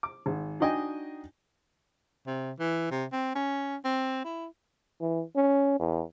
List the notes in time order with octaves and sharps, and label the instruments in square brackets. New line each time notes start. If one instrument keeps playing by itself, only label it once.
[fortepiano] D6
G#1
D4 D#4 F#4 D#5 G5 G#5
[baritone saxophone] C3
E3
C3
C4
C#4
C4
E4
[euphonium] E3
C#4
E2